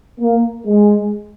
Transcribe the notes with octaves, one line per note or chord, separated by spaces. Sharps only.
A#3
G#3